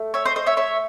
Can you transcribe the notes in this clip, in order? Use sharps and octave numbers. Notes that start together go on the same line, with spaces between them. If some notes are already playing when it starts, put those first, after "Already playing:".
Already playing: A3
C#5 E5
C5 D#5
C5 D#5
C#5 E5
C#5 E5